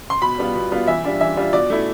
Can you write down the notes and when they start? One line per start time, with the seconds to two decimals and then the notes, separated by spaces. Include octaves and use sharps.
0.10 C6
0.22 B2 B5
0.38 G3 B3 F4
0.55 B2
0.71 G3 B3 F4
0.87 E3 E5
1.05 G3 D4 F4
1.21 E3 E5
1.37 G3 D4 F4
1.53 B2 D5
1.70 A3 E4